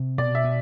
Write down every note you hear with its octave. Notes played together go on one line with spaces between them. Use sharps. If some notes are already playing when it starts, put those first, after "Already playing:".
Already playing: C3
B2 D5
E5
B3